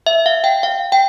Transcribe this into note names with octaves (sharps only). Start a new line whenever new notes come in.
E5
F5
G5
F5
G5